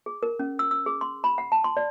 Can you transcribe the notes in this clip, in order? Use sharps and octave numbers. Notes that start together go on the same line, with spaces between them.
G#4
A#4
C#4
E6
E6
G#4
C6
B5
F#5
A5
C6
D5